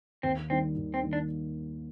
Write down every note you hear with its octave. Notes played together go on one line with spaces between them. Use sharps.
D#2 C4
D#3 G3 A#3 C4 D#4
D#2
C4
D#3 G3 A#3 D#4
D4